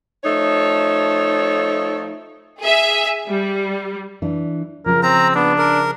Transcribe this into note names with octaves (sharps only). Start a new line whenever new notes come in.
F3 A3 D#4 C#5
G#4 E5
G3
E3 D4
C#3 F3 A#4
C4 A#5
B3 D4
A#4